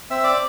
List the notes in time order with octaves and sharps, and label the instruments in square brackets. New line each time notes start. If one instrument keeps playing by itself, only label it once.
[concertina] C4 E5 E6
D5 D6